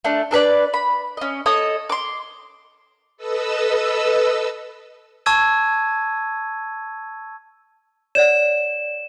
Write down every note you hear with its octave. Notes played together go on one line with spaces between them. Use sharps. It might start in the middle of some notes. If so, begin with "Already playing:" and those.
A3 D4
D4 A4 B4 D5
B5
C#4 D#5
A4 C#5 D#5 D#6
C6 D6
A4 B4 D#5 E6
A5 C#6 E6 G#6 D#7
C#5 D5 F#5 E7